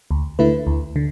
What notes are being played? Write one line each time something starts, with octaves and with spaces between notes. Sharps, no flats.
D2
D3 A3 E4 B4
D2
D3